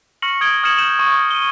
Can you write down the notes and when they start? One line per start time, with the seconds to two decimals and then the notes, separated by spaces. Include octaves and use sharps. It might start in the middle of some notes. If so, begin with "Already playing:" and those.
0.22 C#6 F6 A#6 C#7 F#7
0.41 D#6 G#6 D7 G7
0.63 D#6 F6 G#6 C#7 E7 F#7
0.77 G6 E7 F#7
0.99 C#6
1.31 D#7 G7